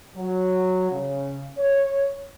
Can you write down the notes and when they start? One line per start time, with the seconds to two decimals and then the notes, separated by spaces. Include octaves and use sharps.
0.16 F#3
0.91 C#3
1.58 C#5